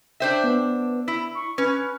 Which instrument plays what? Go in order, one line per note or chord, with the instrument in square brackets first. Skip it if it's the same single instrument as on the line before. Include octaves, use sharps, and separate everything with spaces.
[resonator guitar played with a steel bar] D4 C5 E5 [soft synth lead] G5
[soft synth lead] B3
[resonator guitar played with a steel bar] E4
[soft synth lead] C#6
[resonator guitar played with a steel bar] C#4 [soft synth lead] B4